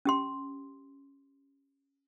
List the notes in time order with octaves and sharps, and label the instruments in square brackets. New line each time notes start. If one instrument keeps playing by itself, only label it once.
[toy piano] C#4 G4 C6